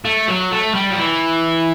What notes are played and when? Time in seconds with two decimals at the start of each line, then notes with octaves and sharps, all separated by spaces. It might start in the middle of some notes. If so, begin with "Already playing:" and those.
0.05 A3
0.28 F#3
0.51 A3
0.74 G3
0.90 F#3
0.98 E3